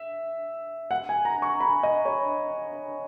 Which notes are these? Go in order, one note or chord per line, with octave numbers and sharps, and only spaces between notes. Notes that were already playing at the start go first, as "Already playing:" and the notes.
Already playing: E5
F#5
G#5
A#5
C#6
B5
D#5
C#5